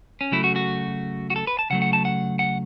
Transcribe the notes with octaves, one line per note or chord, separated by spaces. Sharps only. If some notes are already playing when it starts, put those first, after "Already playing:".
C#4
C#3 F#3 A3 E4
F#4
F#4
F#4
A4
B4
A5
C#3 F#3 A3 F#5
F#5
A5
F#5
F#5